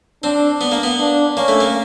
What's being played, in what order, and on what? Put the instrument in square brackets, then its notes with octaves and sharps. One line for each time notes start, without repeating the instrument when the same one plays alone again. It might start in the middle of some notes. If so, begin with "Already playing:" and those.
[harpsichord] C4 [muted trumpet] D4
[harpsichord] B3
A#3
B3
[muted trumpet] D4
[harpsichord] A#3 [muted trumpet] C#4
[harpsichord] A3
A#3